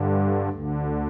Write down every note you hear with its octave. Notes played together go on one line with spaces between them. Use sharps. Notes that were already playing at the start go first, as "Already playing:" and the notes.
Already playing: G2 D3
D2 D3